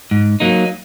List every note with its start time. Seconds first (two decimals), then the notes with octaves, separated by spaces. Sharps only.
0.11 G#2
0.40 F#3 A#3 D#4